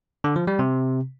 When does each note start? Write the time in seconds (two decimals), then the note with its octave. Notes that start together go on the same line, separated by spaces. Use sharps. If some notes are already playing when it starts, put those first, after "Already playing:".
0.24 D3
0.36 F3
0.47 G3
0.59 C3